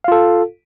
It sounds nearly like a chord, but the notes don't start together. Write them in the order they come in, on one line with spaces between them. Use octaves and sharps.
F5 F4 A4